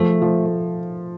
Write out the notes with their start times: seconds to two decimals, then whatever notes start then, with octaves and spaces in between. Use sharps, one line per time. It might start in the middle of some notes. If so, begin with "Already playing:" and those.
Already playing: F3 A3
0.22 F3